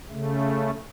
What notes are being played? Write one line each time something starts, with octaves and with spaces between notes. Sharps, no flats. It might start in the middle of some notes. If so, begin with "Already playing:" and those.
C#3 A3